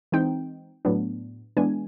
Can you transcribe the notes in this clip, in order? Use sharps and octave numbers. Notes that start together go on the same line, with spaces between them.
E3 G#3 C4 D#4 G5
A2 F#3 B3 D4
E3 G#3 B3 D4 G#5